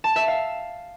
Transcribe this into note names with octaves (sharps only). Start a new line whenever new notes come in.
A5
E5
F5